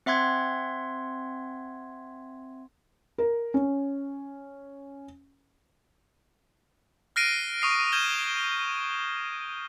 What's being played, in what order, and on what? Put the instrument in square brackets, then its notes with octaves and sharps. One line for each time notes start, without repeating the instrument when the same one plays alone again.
[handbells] C4 E5 F#5 C6 G#6
[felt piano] A#4
C#4
[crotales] F6 F#6 A#6 C7 D7 D#7
C#6 D#6 C7
F6 G6 G#6 E7 G7